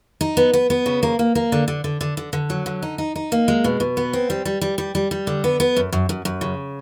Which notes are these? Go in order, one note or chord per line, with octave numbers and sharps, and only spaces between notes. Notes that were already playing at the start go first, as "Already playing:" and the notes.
D#4
B3
B3
B3
C#3
A#3
A#3
A#3
D3
D3
D3
D3
D3
D3
F#3
D3
D#4
D#4
D#4
A#3
G#3
B2
B2
B3
C4
G3
G3
G3
G3
G3
G3
D3
B3
B3
F#2
F#2
F#2
F#2
C#3